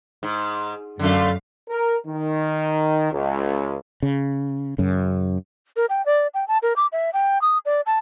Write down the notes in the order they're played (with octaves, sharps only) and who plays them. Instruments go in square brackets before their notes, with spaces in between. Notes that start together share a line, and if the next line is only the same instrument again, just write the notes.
[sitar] G#2
[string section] F#2 F5 [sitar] D3 A3
[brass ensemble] A#4
D#3
C#2
[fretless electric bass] C#3
F#2 C#3
[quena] A#4
G5
D5
G5
A5
A#4
D6
E5
G5
D#6
D5
A5